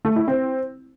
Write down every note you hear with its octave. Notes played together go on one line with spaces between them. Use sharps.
A3
E4
C4